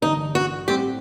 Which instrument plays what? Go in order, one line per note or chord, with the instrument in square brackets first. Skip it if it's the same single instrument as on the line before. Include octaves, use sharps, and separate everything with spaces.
[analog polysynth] A1 G2 D3 [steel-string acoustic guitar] D#4
[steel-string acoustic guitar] F#4
[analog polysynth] A2 G3 C4 [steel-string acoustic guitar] G4